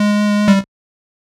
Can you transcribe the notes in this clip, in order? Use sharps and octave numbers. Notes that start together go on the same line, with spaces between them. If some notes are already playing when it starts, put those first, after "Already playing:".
Already playing: G#3
G3